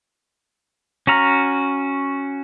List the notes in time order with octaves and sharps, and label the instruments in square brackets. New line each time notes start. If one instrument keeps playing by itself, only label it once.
[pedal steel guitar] C#4 F#4 A#5 F6